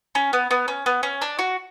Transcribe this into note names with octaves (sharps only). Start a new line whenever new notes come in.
C#4
B3
B3
C#4
B3
C#4
D4
F#4